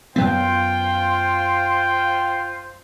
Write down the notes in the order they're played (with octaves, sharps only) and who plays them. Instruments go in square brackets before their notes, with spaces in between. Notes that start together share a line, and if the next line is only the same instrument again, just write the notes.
[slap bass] F#2 F#3 B3 [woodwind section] F4 C5 [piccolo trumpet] G5